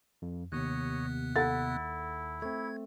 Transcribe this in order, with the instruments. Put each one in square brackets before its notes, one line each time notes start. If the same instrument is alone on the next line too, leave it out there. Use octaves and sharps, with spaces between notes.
[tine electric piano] F2
[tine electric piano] D#2 [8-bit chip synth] C3 B3 F#6 [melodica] C#5 D#5
[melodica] E4 [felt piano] A4 F#5 A6
[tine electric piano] A3 C4 [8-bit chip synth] G#6